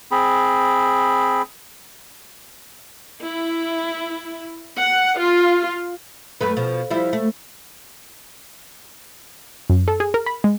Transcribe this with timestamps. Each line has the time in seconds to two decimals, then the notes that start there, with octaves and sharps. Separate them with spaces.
0.11 C4 G#4 B5
3.21 E4
4.77 F#5
5.18 F4
6.41 F#2 A3 B4
6.57 B2 F3
6.90 F3 G3 E4
7.13 A3
9.70 F#2
9.88 A4
10.00 G#4
10.14 A#4
10.26 B5
10.44 G#3